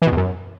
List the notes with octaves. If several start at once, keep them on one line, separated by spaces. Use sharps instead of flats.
E3
B2
E2
F#2